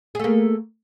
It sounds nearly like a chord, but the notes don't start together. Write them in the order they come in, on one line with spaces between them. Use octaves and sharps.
G#4 A3 A#3